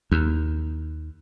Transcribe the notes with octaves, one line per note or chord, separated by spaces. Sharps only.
D#2